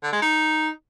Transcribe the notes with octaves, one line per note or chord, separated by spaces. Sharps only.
D3
G#3
D#4